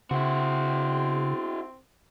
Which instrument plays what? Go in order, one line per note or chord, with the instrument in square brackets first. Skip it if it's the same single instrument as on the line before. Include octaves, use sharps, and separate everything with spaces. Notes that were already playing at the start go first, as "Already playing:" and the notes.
[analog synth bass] C#3 [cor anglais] C4 [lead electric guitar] E4 F#4